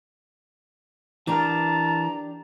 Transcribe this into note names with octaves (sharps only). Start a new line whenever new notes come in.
E3 D4 G4 A#4 A5 A#5